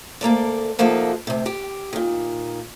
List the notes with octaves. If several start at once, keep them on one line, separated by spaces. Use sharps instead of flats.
D2 A#3 A4 D5
C3 F3 A#3 D#4 F#4 A4
D2 C3
G4
A#2 D#3